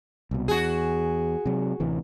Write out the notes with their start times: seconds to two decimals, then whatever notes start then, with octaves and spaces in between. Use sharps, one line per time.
0.31 C2 B2
0.48 E2 F#4 G#4
1.46 C3 F#3
1.80 A1 C3 E3